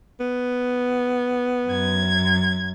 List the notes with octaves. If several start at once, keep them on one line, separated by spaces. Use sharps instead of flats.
B3
F#2 G#6